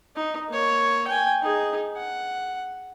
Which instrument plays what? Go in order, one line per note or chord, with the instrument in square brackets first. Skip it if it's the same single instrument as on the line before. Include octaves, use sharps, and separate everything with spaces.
[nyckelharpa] D#4
A#3 C#5
G5 G#5
D#4 G#4
F#5